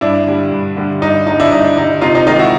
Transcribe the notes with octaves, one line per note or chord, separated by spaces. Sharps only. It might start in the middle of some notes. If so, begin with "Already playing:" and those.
G2 D4 E4
D3 G3
G2
D3 G3
G2 D#4
D3 G3 D#4
D4 E4
G2 D#4
D4
D3 G3 D#4
C3 D#4 F4
D#4
D#3 G#3 D#4 F4
E4 F#4